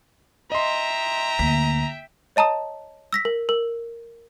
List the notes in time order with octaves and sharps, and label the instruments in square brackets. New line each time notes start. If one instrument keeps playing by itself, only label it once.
[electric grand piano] D#5 C6 [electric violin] E5 G5 [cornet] A#5
[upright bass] D2 A#3 [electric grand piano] B6
[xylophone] C#5 D#5 A5 A#5 D#6
E6 A#6 B6
A#4
A#4